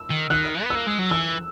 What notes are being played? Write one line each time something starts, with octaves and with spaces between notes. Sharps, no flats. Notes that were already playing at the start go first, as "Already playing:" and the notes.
Already playing: E6
D#3
D#3 F#6
B3
E6
A#3
G#3
F#3
E3 E6